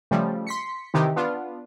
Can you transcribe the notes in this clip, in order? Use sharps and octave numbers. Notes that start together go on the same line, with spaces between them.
C#3 F3 G3 A3
C6 B6 C#7
C3 D#3 E3 D#4 G4
B3 D4 F4